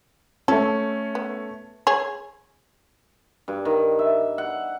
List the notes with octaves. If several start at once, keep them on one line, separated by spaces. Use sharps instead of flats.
A3 C#4 A4
B3
G#4 C#5
G2
D#3
E5
F#5